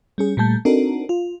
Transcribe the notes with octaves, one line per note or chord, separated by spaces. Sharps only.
G3 C#4 G#4
A#2 G3 A3 A5 G6
C4 D4 D#4 F#4 A4 A#4
F4